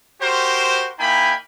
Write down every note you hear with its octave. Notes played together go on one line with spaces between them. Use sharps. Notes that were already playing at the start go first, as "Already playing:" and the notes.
F#4 G4 A#4 C5
A#3 D#4 E4 G5 G#5 B5